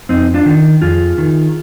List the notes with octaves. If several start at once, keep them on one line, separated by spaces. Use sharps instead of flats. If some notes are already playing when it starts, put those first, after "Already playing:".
F2 C4 D#4
D4 F4
D#3
F2 F4 G#4
D#3